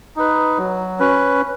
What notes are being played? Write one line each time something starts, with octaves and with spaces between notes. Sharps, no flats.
D#4 B4
F#3
C#4 B4